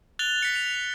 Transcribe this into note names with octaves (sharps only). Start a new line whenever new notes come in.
F#6 A6 F7 G7
B6 C#7
C#7 F7